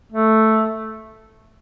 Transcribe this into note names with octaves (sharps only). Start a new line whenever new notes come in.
A3